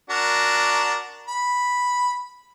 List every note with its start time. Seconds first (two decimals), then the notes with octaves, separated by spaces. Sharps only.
0.10 D4 F#4 A#4
1.28 B5